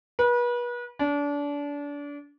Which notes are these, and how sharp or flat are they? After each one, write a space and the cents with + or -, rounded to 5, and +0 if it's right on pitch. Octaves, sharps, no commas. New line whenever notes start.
B4 -35
D4 -30